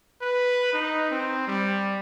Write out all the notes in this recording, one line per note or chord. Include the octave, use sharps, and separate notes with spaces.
B4
D#4
C4
G3